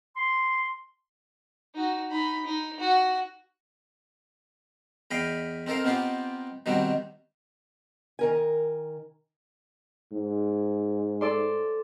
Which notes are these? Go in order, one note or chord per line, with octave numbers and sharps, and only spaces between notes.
C6
D#4 F#4
D#4 B5
D#4
F#4
E2 D#5 F5 G5 B5
C4 D#4 A4 A#4 F5
B3 C4 D#4 F4 G4
B2 D#3 G3 C4 D#4 F#4
D#3 A#4 G#5
G#2
A4 D5 C6